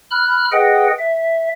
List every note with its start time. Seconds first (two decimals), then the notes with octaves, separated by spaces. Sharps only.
0.11 B5 F6 F#6
0.52 G#4 B4 D#5 F#5 G5
0.99 E5